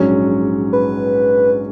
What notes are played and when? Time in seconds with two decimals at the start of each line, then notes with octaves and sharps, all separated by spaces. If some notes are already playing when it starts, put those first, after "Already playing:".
Already playing: A#1 G#2 F#3 C#4
0.73 B4